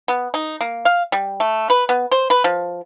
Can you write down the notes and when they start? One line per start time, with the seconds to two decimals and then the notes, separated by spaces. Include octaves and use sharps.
0.08 B3
0.34 D#4
0.61 A#3
0.85 F5
1.12 G3
1.40 A3
1.70 B4
1.89 B3
2.11 C5
2.30 B4
2.44 F3